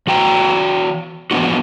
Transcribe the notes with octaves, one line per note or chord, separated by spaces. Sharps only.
E3 F#4 G5 A#5
E3 F3 A#3 B3 D4 F#4